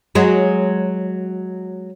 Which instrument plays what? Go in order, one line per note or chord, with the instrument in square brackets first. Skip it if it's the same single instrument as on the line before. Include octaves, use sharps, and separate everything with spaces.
[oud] F#3 G#3